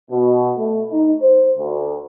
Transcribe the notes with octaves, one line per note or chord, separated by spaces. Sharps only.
B2
A3
D#4
C5
D2